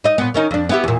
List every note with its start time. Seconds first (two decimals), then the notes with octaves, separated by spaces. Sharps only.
0.04 D#4 D#5
0.18 A#2 B3
0.34 D#3 C#4 D#4
0.51 F2 D4
0.69 B3 E4 G4
0.84 E2 A#2